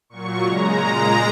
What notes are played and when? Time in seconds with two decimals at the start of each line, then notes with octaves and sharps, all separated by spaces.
0.10 A#2 F#3 C#6
0.44 C#3 G#3 A#5
0.79 A#2 G#3 A#5